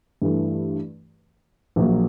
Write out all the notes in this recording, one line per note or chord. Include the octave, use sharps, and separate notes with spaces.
G2 E3 A3
A#1 A#2 F#3 A#3